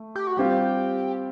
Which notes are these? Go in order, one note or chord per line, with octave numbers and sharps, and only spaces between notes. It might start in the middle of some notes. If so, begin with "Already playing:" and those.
Already playing: A3
G4
F#4
G3 C4 F4 G4